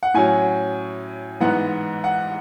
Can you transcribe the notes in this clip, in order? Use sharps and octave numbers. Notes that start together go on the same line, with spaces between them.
F#5
A2 F#3 C#4 G#5
G#2 E3 B3 F#5
F#5